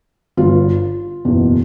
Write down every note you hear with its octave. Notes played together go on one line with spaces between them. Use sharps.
G1 G2 D3 F4
F#1 E2 B2